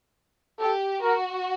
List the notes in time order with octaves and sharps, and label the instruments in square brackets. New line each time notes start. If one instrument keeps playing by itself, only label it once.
[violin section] G4 [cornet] A4
[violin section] F#4 [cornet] A#4